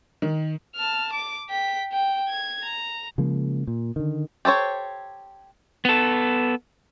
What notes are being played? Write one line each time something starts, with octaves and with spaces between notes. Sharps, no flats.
D#3
A5 F6
D6
G5 B6
G5
G#6
A#5
C#3 F3 G#3 A#3
A#2
D3 D#3
G4 A4 C5 C#5
B3 A4